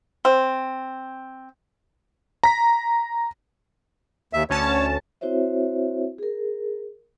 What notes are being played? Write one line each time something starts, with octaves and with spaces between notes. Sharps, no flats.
C4
A#5 B6
D#2 E5
D2 C#4 C#5 A5
C4 E4 F#4 C5 C#5 E5
G#4 A#4